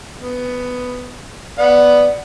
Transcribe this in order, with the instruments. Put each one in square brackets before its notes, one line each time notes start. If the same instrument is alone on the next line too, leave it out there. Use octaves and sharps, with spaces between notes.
[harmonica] B3
[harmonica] B3 F#5 [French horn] D5